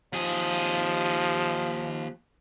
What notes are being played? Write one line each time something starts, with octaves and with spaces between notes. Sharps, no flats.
D#2 F3 G#4